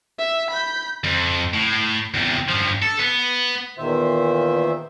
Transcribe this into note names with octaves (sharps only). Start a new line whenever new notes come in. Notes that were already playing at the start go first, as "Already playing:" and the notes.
E5
B5 G6
F2
A2
E2 C3
G2 F3
A4
B3
E2 A#2 D#3 C5 E5